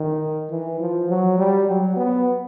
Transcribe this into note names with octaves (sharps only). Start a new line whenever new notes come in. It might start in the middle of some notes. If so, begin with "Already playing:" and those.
Already playing: D#3
E3
F3
F#3
G3
F#3
B3